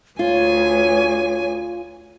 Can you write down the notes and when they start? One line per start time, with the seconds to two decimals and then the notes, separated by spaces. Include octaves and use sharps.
0.19 D2 F4 C#5 G#5